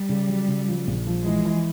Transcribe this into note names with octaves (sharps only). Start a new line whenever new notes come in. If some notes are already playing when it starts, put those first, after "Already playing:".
Already playing: G3
C#3
F#3
C#3
F3
A#1
F3
E3 G#3
E3